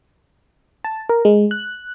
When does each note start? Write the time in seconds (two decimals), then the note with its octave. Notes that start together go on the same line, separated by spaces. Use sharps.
0.84 A5
1.09 A#4
1.25 G#3
1.51 F#6